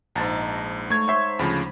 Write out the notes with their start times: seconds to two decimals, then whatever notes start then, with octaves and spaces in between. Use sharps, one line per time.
0.16 A#1 G#2 A5 A#5
0.90 A3 C#5 G#6
1.08 C5 C#5 E5 C6 C#6
1.39 D2 C#3 F3 B5